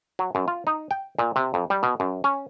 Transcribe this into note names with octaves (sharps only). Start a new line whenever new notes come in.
F#3
F#2
F4
D#4
G5
A#2
C3
F2
G3
B2
F#2
C#4